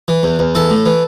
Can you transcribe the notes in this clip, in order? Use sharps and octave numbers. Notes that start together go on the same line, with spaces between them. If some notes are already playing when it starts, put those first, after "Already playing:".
E3
E2
E2
E3 A4
A2
E3